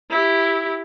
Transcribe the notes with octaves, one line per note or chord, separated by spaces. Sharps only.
E4 G4